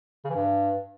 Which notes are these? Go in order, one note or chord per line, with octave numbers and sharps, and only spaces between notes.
C#3
E3
G2